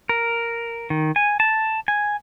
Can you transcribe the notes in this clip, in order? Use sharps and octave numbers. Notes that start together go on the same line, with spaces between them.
A#4
D#3
G#5
A5
G#5